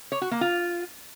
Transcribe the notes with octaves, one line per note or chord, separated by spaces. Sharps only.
C#5
F#4
A#3
F4